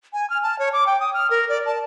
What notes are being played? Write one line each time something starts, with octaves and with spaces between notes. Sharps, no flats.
G#5
F6
A5
C#5
D6
G5
D#6
F6
A#4
D5
A5